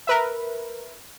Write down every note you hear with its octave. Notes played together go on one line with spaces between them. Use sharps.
A#4 B4 E5